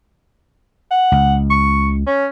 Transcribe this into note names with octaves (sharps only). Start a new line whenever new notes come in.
F#5
C#2
C#6
C#4